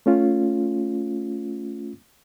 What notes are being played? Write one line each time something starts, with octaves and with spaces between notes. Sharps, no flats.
A3 C#4 F4